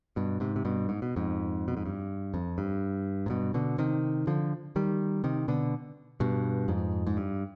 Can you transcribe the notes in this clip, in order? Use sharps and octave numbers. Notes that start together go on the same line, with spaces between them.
G2 B2
G#2 C3
C3
G2 B2
G#2
B2
F2 G#2
B2
G#2
G2
F2
G2
G#2
G2 B2
B2 D3
C3 D#3
D3 F3
D#3 G3
C3 D#3
B2 D3
G2 B2
F2 G#2
G#2
G2